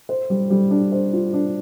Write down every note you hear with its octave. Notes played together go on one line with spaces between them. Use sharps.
C5
G3
G3
D4
C5
F4
D4